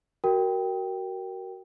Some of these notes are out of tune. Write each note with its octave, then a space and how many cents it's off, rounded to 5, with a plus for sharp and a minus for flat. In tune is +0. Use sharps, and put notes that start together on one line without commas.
F#4 +20 A#4 +0 G5 +0